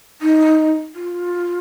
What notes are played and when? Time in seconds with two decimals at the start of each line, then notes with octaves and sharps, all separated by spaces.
0.21 D#4
0.95 F4